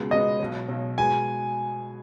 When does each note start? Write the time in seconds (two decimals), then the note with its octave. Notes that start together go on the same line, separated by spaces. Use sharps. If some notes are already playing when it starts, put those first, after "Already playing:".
Already playing: C#2 B2 G#3 B3
0.10 C#2 B2 G#3 B3 D#5
0.39 B1 B2 F#3
0.68 B1 B2 F#3
0.98 B2 G#3 B3 G#5